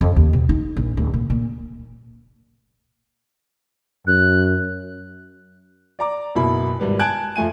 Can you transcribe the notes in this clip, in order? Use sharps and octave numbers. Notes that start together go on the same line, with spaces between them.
F2
D#2
B2
D#4
A#1
D1
A#2
A#2
F#2 F#6
D5 A#5 D6
F#1 B2 E4 B5
G#1 G3 B4
G#5 A5 F#6 G#6 D7
F2 F3 A3 G#5 D#7